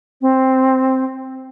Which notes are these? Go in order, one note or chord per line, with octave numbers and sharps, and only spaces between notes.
C4